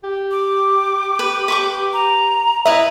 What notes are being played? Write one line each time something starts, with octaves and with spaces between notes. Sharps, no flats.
G4
D6
B4
B4 C#6 D6
A#5
E4 B4 D#5 E5 A#5